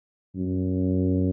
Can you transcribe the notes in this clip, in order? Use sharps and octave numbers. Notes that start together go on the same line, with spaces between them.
F#2